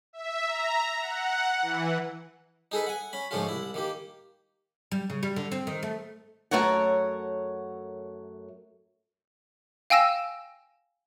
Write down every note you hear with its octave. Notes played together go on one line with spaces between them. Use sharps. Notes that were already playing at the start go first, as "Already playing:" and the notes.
E5
A#5
F#5
E3
D#4 G#4 A4 B4
F#5 G#5
C#4 B5
G#2 D3 F3 A3 C#4 F4
C2 E4
D#3 A#3 G4
G3
C#3
G3
D3
C4
D#3
A3
F#2 E3 A3 A#4 C#5 F#5
F5 G5 G#5 E6 A#6 E7